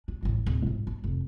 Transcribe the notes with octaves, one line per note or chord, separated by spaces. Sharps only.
D4
A1 D2
D1
G#2
D4
F1